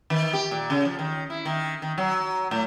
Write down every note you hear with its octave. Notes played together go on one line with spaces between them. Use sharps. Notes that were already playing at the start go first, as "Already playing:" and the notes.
D#3
G4
A#2
C#3
F3
D#3
E4
D#3
D#3
F#3
A2